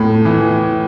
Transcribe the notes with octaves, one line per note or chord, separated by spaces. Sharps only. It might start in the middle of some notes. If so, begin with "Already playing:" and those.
Already playing: A2
E3